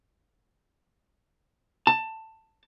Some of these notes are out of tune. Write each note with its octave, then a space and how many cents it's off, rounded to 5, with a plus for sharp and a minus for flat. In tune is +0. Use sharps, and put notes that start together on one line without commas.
A5 +15